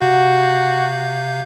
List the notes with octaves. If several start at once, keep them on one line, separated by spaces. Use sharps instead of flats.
C3 F#4 F5 G6